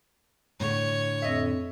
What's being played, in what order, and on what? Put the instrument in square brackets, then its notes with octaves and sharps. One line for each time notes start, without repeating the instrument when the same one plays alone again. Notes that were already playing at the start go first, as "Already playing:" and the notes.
[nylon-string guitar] A2 D3 [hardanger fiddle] C#5
[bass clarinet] F2 [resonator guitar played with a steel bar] D#5 E5